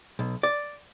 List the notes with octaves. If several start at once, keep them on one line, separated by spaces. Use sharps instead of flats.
B1
D5